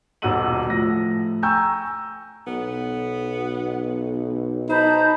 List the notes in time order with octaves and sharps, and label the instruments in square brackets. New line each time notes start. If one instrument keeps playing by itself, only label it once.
[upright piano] D#1 B1 F#5 E6 D#7 F#7
A2 F3 A#6
G5 G#5 A#5 C#6 E6 G6
[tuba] B1 [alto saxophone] B3
[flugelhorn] D#4 [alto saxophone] C5 [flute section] A5 B5 G6